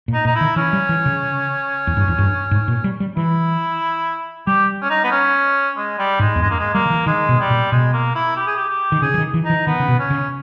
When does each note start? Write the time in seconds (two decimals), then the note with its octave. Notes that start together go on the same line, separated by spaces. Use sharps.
0.08 A#2
0.14 D#4
0.25 A#2 D#4
0.35 E4
0.41 D#3
0.56 E3 C#4
0.73 G3
0.89 E3
1.06 C#3
1.87 E2
1.97 G2
2.08 E2
2.19 G2
2.51 G#2
2.68 A#2
2.84 G3
3.00 G3
3.17 E3 E4
4.47 G3 G4
4.82 C#4
4.90 D#4
5.04 B3
5.11 C#4
5.77 G#3
5.98 G3
6.19 G#2 G#3
6.36 E2
6.42 G2 G#3
6.50 A#3
6.59 G#3
6.74 G3 A#3
6.86 D#3
6.90 E3
7.06 D#3 G#3
7.29 B2
7.40 G3
7.50 A#2
7.71 B2 G#3
7.93 A#3
8.15 E4
8.36 G4
8.47 G#4
8.57 G4
8.69 G4
8.92 D#3
9.02 C#3 G#4
9.14 E3
9.18 D#3
9.34 E3
9.45 D#4
9.50 E3
9.67 D#3 B3
9.80 C#3
9.88 B2
9.99 C#4
10.10 C#3